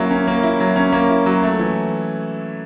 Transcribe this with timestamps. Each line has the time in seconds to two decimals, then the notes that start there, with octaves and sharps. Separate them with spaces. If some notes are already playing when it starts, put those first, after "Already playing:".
Already playing: F#3 A#3 C#4 E4
0.11 C#4
0.27 A#3
0.43 E4
0.60 F#3
0.76 C#4
0.92 A#3
1.10 E4
1.26 F#3
1.43 A3
1.59 E3